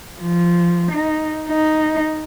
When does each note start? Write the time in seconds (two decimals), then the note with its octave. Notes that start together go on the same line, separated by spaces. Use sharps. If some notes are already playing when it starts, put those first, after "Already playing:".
0.21 F3
0.92 D#4
1.48 D#4